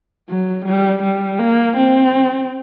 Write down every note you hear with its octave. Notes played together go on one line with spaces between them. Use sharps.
F#3
G3
G3
A#3
C4